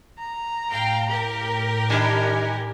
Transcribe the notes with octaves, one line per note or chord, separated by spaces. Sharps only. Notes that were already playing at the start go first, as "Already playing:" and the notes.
A#5
A2 F5 G5
G4 A#4
D#3 G3 D4 G#5